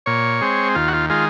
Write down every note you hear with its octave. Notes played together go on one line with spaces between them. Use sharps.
A#2 C#5
G#3 C4
D#2 F4
F#4
F4
D#3 G#3 F4